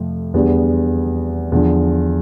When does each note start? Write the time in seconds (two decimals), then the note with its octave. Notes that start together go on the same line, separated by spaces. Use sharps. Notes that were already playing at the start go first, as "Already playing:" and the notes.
Already playing: F2 C3 F3 A3
0.34 E2 D3 G3 B3
1.52 E2 D3 F3